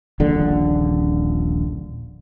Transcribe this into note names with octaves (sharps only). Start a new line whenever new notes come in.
D#1 A#1 D3